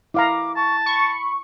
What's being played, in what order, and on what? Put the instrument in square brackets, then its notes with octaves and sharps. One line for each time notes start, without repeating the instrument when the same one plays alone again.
[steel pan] E4 F5 A#5 [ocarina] D6
[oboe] A5 [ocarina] C#6
[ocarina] B5 [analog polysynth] C#6